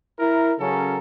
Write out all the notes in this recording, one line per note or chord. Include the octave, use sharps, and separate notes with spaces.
E4 A#4
C#3 F#3 C#4 A4 A#4